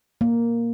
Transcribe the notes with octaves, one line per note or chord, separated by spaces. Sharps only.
A#3